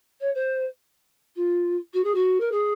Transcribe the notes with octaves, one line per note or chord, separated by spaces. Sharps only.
C#5
C5
F4
F#4
G#4
F#4
A#4
G#4